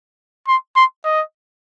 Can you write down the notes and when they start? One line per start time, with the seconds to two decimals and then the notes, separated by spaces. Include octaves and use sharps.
0.48 C6
0.76 C6
1.05 D#5